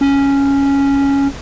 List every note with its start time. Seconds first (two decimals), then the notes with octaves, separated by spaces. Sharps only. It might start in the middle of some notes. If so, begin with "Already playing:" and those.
0.01 C#4